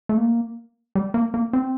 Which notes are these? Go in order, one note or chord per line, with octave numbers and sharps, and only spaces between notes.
A3
A#3
G3
A#3
A#3
C4